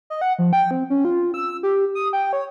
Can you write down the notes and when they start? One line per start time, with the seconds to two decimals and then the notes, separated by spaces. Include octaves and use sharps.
0.10 D#5
0.21 F#5
0.39 F3
0.53 G5
0.71 C4
0.90 C#4
1.05 F4
1.34 E6
1.63 G4
1.95 D#6
2.13 G5
2.33 C#5